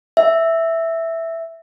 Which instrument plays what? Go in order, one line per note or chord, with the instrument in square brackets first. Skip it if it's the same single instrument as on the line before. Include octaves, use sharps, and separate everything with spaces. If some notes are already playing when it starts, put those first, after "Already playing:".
[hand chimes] E5